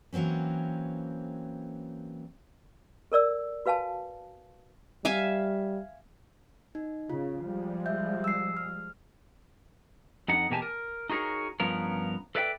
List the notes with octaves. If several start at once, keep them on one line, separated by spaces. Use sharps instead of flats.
E3 F#3 A#3 C4 C#4
A4 A#4 D5 E6
F#4 B4 F5 G#5 A5
G3 E5 F5 G#5
D#4
C#3 F4
F3 G3 G#3
E5 G6
E6 C7
F6
F2 D#4 F#5
E2 B2 A#3 G4 G#5 A5
A#4
D#4 F#4 G#4 A#4 C#5
G2 F3 B3 C#4 A#4
A4 B4 D5 E5 F#5 G5